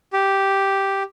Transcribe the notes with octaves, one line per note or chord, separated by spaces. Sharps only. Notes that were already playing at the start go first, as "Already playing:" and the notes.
G4